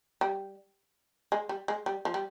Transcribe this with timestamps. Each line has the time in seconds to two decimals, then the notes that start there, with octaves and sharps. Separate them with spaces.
0.21 G3
1.32 G#3
1.49 G3
1.68 G#3
1.86 G3
2.05 F3
2.14 G3